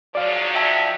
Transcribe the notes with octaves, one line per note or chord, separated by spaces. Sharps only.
G#2 F3 F#3 D5 F5
E5 G5 A5 G#6